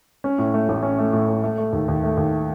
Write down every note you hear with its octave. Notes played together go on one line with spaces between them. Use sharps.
C#4
A2
A3
A1
C#4
A3
A2
A3
A3
A3
D#2
D#2
A3
D#2